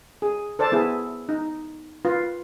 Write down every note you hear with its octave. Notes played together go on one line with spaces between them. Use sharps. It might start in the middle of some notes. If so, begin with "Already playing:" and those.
G#4
A4 C5 D5 A5
B3 E4 G#4
D#4
F4 B4